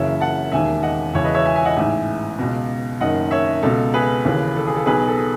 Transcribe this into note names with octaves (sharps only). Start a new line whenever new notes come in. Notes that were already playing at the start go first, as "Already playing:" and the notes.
Already playing: F#1 F#2 C#3 E3 C#5 E5
F#5 A5
E1 D#2 D#3 E5 G#5
D#5 F#5
E1 E2 C#3 E3 C#5 E5
B4 D#5
C#5 E5
E5 G#5
E5 G#5
D#5 F#5
A1 G#2 E3 E5 G#5
C#2 B2
F#1 F#2 D#3 D#5 F#5
C#5 E5
C#2 B2 A4
G#4 B4
D#2 C#3 E3
A4
G#4
A4
B1 B2 G#4 B4
A4
G#4